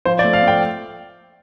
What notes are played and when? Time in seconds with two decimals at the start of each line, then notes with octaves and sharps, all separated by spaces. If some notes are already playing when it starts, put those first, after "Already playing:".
0.05 F3 C5
0.19 D5
0.24 A3
0.33 F5
0.43 A3 G5